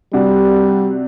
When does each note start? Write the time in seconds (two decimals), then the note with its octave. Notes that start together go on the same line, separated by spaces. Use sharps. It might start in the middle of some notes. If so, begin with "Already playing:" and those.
0.13 C3 G3 D4 F#4